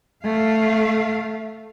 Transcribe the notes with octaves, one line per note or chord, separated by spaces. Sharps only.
A3 F5